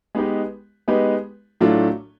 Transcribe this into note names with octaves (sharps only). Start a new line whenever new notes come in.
G#3 B3 D#4 G4 B4
G#3 B3 D#4 G4 B4
A2 F#3 A3 D4 F4